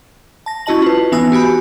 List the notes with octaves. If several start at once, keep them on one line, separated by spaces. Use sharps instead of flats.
A5 A#6
C#4 E4 F#4 D#5 A5 F#7
F4 B4
E3 B3 D#4 G#5 D#6 E6
F#4 G4 G#5 B5